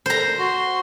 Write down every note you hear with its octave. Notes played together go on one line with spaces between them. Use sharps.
C5 A#5
F#4 C6